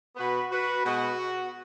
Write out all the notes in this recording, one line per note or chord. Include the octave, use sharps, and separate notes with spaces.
B2 B3 F#4 B4
F#4 B4
B2 G#3 B3 F#4